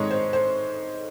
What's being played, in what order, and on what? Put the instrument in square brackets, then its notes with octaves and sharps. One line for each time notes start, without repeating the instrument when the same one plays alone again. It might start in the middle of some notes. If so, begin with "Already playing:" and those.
Already playing: [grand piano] G#2 D#3 G#3 D#4 C#5
C5
C5